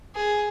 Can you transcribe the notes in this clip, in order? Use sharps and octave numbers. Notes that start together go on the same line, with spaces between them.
G#4